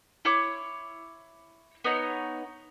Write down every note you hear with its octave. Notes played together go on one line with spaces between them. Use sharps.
E4 C#5 D6
B3 D#4 C#5